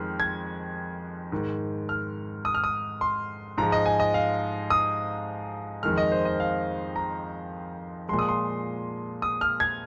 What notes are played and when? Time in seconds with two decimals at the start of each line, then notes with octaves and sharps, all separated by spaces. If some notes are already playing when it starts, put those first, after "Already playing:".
Already playing: F2 D#3 G#3 F6
0.20 G#6
1.32 G#2 D#3 G#3
1.89 F6
2.45 D#6
2.55 F6
2.64 D#6
3.01 C6
3.58 G#2 F3 G#3 A#5
3.72 D#5
3.86 G#5
4.00 D#5
4.14 F5
4.70 D#6
5.83 F2 D#3 G#3 F6
5.98 D#5
6.12 C5
6.25 D#5
6.40 F5
6.96 A#5
8.09 A#2 F3 G#3 C6
8.19 D#6
8.29 C6
9.22 D#6
9.41 F6
9.60 G#6